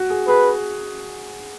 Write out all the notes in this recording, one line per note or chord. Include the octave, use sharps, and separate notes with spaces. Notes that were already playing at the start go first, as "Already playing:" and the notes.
Already playing: F#4
G#4
G#4 B4